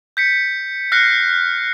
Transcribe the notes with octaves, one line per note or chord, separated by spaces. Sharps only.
G6 B6 C#7
F6 F#6 A#6 C7 C#7